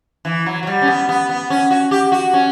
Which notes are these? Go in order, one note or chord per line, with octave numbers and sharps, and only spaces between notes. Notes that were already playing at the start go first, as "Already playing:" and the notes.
E3
F#3
F#3
G3
C#4
B3
B3
B3
C#4
F#4
G4
F#4
C#4